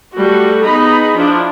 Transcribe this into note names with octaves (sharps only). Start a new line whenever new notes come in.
G3 A3 F#4 A4
B3 D#4 G#4 D#5 A#5 B5
F3 D4 E4